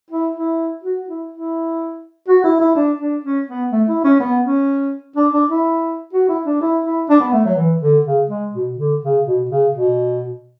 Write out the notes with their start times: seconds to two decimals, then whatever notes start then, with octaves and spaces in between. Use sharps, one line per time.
0.11 E4
0.35 E4
0.83 F#4
1.08 E4
1.31 E4
2.28 F#4
2.44 E4
2.60 E4
2.76 D4
3.00 D4
3.24 C#4
3.48 B3
3.72 A3
3.88 E4
4.04 C#4
4.20 B3
4.44 C#4
5.16 D4
5.33 D4
5.49 E4
6.13 F#4
6.29 E4
6.46 D4
6.61 E4
6.85 E4
7.10 D4
7.21 B3
7.33 A3
7.46 F#3
7.57 E3
7.81 D3
8.05 C#3
8.29 G#3
8.53 B2
8.78 D3
9.02 C#3
9.25 B2
9.49 C#3
9.74 B2